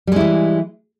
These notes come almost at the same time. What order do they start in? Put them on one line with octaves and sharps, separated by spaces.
G3 G#3 E4 E3